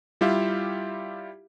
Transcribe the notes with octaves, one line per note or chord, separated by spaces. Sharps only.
G3 E4 F4 G4 E5 F5